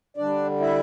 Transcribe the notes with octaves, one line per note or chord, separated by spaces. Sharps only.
D3 G3 D4 D5
E4 E5